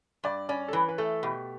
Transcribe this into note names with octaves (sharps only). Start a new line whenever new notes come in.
G2 D5
C#4 D5
A4
E3 B4
B4
A3 A4
B2 G4